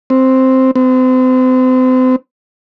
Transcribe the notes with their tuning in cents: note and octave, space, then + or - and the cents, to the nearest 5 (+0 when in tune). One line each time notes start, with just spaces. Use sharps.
C4 +0
C4 -35